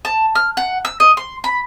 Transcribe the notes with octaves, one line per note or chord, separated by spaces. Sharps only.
A5
F6
F#5
E6
D#5
C6
B5